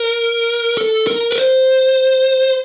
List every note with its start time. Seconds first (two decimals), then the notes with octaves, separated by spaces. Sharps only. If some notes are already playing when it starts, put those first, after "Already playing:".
Already playing: A#4
0.78 A4
1.07 A#4
1.31 B4
1.37 C5